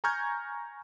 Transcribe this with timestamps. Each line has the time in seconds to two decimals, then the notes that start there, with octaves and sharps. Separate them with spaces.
0.04 G#5 A#5 C#6 F6 G6 G#6